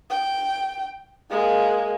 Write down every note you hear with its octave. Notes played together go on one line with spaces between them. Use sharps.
G5
G#3 A#3